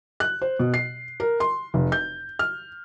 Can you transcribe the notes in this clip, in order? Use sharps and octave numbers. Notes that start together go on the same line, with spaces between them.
F#6
C5
B2
C7
A#4
C6
F1
G6
F6